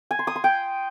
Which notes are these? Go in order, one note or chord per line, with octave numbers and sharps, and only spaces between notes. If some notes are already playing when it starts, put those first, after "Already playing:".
G#5
C6
D#6
C6
G5